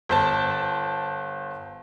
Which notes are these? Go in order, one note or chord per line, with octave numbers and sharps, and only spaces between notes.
G1 C5 A5